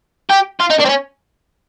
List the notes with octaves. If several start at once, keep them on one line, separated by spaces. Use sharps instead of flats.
G4
F4
D#4
D4
C4
C#4